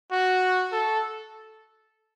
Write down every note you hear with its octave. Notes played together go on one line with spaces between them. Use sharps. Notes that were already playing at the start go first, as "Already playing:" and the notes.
F#4
A4